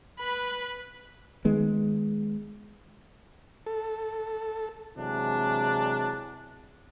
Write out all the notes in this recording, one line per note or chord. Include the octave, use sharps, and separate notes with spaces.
B4 B5
D#3 G#3 B3
A4
C3 E3 F#3 G#3 D4